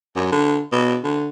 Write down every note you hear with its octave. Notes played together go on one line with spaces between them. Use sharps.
F#2
D3
B2
D3